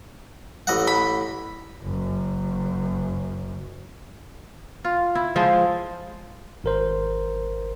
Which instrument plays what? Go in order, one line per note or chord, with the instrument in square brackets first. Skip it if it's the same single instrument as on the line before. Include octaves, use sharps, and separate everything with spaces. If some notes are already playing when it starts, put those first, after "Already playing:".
[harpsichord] A1 D#5 F#5
[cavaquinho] B5
[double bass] F#1 F#2
[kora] F4
E4
F3 G#3 C5
[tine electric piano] G#1 A#4 C5